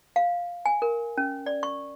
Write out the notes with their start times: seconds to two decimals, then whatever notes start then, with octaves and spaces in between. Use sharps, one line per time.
0.16 F5
0.66 G#5
0.82 A#4
1.18 C#4
1.46 D5
1.63 C#6